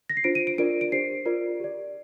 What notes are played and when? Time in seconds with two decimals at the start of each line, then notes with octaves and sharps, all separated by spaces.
0.10 A#6
0.17 C7
0.24 D4 F4 C5 D7
0.35 D#7
0.47 D7
0.58 D4 F4 A#4 D5 D7
0.81 D7
0.92 D4 G4 C5 C7
1.26 F4 A#4 D5
1.60 G4 D5